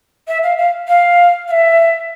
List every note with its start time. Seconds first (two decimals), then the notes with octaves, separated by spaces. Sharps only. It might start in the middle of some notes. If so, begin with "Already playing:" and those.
0.28 E5
0.43 F5
0.58 F5
0.88 F5
1.48 F5
1.51 E5